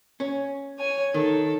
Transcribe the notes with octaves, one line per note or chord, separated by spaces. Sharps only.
C#4
C#5 G#5
D#3 A4